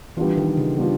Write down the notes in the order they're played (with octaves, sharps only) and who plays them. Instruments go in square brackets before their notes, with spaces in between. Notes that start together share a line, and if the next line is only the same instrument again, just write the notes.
[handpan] E3 [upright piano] G3 B3 D4 F4
[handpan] D#3
C#3
[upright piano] G3 B3 D4 F4